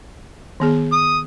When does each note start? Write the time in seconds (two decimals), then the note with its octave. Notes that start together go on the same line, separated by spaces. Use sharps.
0.60 D#3 B3 G#4
0.92 D#6